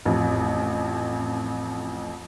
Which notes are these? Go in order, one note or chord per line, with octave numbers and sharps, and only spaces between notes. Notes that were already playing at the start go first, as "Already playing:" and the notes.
A1 F2